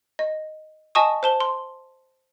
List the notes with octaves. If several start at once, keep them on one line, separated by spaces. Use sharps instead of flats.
D#5
D#5 G#5 A5 C#6 D#6
C5 A5 G7
C6